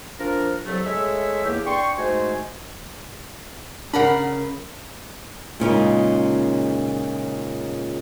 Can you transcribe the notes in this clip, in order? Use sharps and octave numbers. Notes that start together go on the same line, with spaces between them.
F3 D4 A#4
C2 F#3 A3
G#3 A3 C#5 E5
E2 A#3 G4
D4 G5 C6 C#6
G#2 G#3 A3 F#4 C5 G#5
C#3 D4 A#4 F#5 B5
A#2 C#3 G#3 D#4